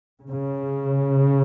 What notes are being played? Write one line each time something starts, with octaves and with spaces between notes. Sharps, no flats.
C#3